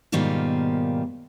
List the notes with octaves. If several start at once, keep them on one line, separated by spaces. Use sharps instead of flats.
G#2 B2 D#3 G3 A#3 F4